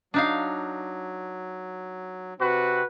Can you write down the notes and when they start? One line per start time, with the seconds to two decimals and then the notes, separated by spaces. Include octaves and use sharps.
0.14 F#3 D4 D#4 F5
2.40 C3 C4 F#4 B4